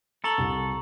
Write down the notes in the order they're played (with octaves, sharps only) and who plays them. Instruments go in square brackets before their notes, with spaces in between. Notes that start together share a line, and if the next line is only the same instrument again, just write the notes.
[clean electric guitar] A4 [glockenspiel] A#5 C#6 F#7
[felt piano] C2